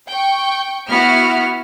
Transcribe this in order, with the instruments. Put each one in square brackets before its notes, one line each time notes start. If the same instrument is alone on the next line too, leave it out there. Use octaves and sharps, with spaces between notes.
[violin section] G5 C#6
[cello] B3 [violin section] E4 F#4 F6